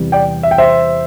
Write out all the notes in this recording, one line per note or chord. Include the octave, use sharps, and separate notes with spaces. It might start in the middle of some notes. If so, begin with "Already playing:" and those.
Already playing: E2 C3 E3 G3
D5 G5
E5
G5
C5 E5